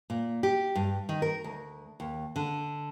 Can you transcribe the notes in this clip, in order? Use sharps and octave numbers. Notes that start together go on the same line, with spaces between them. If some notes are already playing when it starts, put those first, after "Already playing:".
A#2
G4
G2
D#3
A#4
D2
D#2
D3